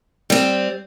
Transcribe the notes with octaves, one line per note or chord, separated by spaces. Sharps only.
G3 C4